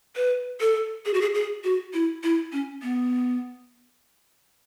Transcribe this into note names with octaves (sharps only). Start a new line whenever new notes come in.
B4
A4
G#4
F#4
G#4
G#4
F#4
E4
E4
C#4
B3